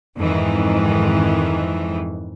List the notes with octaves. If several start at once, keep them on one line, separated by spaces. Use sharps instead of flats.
F2 G#2 D#3 E3